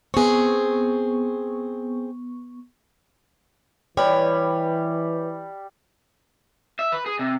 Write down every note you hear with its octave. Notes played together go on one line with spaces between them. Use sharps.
B3 C4 G#4 C#6
E3 G3 B4 C#5
E5
B4
G#4
C3